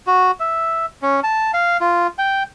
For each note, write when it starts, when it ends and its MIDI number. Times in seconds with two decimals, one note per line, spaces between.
0.07 0.31 66
0.40 0.86 76
1.02 1.20 61
1.23 1.51 81
1.54 1.77 77
1.81 2.07 65
2.18 2.43 79